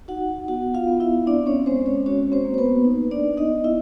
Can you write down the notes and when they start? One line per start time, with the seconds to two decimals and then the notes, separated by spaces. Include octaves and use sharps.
0.08 D#4 F#4 F#5
0.48 B3 F#4 F#5
0.74 F4 F5
0.87 B3
1.00 E4 E5
1.27 C4 D4 D5
1.46 C#4 C#5
1.66 G#3 C4 C5
1.86 C#4 C#5
2.06 C#4 F#4 C#5
2.32 C4 C5
2.45 A#3
2.54 C5
2.58 B3 B4
2.85 D#4
3.11 D4 D5
3.24 B3
3.37 D#4 D#5
3.64 B3 E4 E5